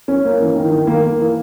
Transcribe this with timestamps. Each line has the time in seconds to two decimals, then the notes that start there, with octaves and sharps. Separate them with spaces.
0.08 C#4
0.24 A#3
0.40 E3
0.56 D#3
0.71 D#3
0.87 A#3
1.03 A#3
1.20 E3